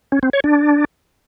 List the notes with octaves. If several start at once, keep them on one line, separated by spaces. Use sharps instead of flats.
C#4
C4
C#5
D4